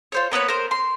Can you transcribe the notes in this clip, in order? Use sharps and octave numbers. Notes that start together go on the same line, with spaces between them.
F4 C5 C#5
A#3 B3 B4 C#5
A#4 C5
C6